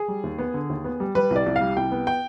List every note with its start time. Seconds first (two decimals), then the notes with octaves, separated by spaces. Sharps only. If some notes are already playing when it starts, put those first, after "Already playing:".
Already playing: G#4
0.08 G3
0.24 D#2
0.39 B3
0.54 D3
0.70 D#2
0.84 B3
1.00 G3
1.15 G3 B4
1.30 C2
1.36 D5
1.46 C2
1.56 F5
1.61 G3
1.76 C2 G5
1.91 B3
2.07 G5